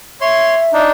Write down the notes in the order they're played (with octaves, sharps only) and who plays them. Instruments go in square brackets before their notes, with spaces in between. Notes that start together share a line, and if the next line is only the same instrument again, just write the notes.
[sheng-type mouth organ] C#5 C6 [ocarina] E5
[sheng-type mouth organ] D4 D#4